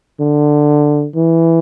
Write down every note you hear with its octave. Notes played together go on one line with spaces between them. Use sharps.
D3
E3